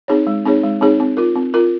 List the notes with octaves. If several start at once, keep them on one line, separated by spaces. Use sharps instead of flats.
C4 D#4 G#4 C#5
G#3
C4 D#4 G#4 C#5
G#3
C4 D#4 G#4 C#5
C4
F4 A#4
C4
F4 A#4